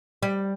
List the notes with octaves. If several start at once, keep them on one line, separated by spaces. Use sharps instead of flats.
G3